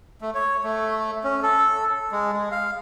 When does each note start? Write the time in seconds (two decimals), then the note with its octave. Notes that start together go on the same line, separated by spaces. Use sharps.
0.21 A3
0.35 C#5
0.64 A3
1.24 C#4
1.42 A4
2.12 G#3
2.33 G#3
2.52 F5